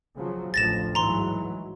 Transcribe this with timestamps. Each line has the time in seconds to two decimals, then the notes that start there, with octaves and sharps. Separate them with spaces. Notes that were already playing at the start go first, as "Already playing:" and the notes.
0.16 C#3 F3 F#3
0.54 A1 D2 F3 A6 A#6 E7
0.95 G#2 E3 F#3 A#5 C6